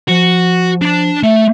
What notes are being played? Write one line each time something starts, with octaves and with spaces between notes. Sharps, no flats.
F3 F#4
D4 A5
A3 E5